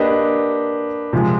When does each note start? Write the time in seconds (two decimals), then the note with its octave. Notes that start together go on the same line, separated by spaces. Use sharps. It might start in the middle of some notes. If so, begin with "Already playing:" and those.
Already playing: A#3 D4 G4 B4 D#5
1.13 C3 F3 G#3